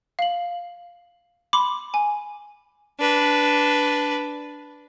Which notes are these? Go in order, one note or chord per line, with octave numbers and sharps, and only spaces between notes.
F5 F#7
B5 C6 D6
G#5
D4 B4